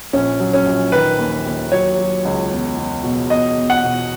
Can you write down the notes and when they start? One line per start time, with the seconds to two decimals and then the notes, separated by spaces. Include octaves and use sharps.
0.13 A#1 C#4
0.40 F#3
0.53 C#4
0.66 A#1
0.92 D#3 B4
1.19 D#2
1.46 D#2
1.72 F#3 C#5
1.98 F#3
2.25 C#2
2.51 E2
2.77 E2
3.03 B2
3.30 E2 D#5
3.57 E2
3.70 F#5
3.83 B2